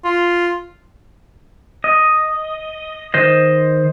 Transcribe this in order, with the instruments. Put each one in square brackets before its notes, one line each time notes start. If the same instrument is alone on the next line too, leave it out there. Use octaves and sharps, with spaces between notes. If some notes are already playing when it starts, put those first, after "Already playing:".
[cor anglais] F4
[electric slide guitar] D#5
D#3 C5 D#5